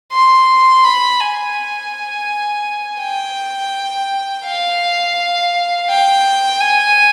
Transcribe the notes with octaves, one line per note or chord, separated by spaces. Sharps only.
C6
B5
G#5
G5
F5
G5
G#5